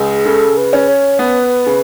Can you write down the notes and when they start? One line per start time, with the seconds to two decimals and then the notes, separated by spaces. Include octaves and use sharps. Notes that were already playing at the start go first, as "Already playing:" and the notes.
Already playing: C#2 G#4
0.26 C#3 A4
0.57 B4
0.73 C#4
0.88 C#5
1.19 B3 B4
1.66 C#3